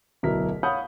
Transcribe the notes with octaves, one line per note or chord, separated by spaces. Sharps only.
D1 B1 B2 E4 A#4 B6
C#5 F5 F#5 B5 D#6 G6